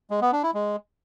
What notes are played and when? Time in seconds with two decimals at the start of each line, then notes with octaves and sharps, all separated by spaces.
0.10 G#3
0.21 B3
0.32 D4
0.43 E4
0.54 G#3